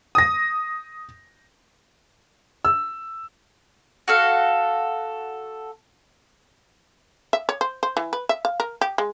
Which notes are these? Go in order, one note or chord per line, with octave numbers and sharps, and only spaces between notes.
D#6 A#6
E6
F#4 A4 F5
E5
C#5
C5
C5
E3
B4
E5
F5
A#4
G4
G#3